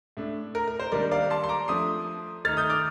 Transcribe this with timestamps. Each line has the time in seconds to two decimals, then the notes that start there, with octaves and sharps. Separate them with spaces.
0.17 A2 A3 D4
0.55 A#4
0.67 A#4
0.79 C5
0.92 D#3 G3 A#3 D4 A#4 D5
1.11 D5 F5
1.30 A5 C6
1.44 C6
1.49 A#5 D6
1.68 F3 A3 D4 C6 D#6
2.45 D#3 A3 D#4 F6 A6
2.57 D#6 G6
2.70 D6 F6